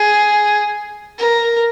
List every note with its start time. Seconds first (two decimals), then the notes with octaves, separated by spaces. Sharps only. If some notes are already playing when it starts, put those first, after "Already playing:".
Already playing: G#4
1.18 A#4